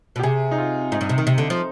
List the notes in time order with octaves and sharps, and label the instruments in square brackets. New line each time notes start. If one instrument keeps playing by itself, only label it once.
[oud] B2
[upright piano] G4
[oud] C3 [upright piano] G#4
[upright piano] D#4
F4
[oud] G#2 [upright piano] D#4
[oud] G2
C3
D#3
C3
D3
F3